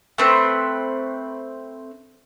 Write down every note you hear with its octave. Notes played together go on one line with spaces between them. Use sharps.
A3 C4 B4